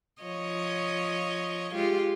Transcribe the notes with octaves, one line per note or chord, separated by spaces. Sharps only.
F3 C#5 D#5
G#3 F4 G4